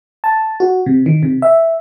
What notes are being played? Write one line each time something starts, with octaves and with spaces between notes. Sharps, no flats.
A5
F#4
C3
D#3
C3
E5